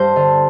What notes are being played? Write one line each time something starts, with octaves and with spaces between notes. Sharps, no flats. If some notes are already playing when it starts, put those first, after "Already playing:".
Already playing: G2 C5
D3